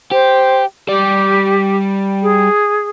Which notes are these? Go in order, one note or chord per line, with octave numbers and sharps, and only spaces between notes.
G4 C5
G3 G4 D5
G#4